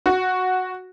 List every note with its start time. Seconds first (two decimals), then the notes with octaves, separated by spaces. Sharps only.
0.06 F#4